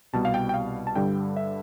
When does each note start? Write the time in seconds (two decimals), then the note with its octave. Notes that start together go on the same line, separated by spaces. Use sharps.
0.13 C2 B2 G3 A5
0.25 F5
0.34 G5
0.49 G5
0.54 F5
0.87 A5
0.95 G2 D3 G3 G5
1.37 E5